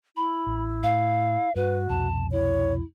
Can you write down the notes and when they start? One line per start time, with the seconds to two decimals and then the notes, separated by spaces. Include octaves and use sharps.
0.17 E4 B5
0.47 A1
0.83 A2 F5
1.56 G2 F#4 B4
1.89 C2 F2 B2 A5
2.32 E4 C#5